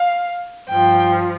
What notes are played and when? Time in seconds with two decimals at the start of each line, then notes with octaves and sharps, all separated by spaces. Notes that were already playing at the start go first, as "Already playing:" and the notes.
Already playing: F5
0.69 G2 F3 G5